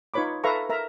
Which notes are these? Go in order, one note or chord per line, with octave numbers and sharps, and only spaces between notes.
D#4 F4 B4 C#5 B5 D6
A4 B4 E5 F5 A#5 C#6
A#4 E5 A#5